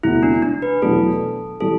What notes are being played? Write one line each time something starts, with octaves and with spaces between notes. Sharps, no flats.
E1 D2 C3 E3 B3 E4
D4
D4
B4
E2 B2 F#3 A3 D4 A4
E3 G3 A4